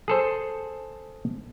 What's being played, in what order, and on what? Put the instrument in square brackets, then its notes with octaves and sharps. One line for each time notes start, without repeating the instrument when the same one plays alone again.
[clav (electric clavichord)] G#4 A4 C5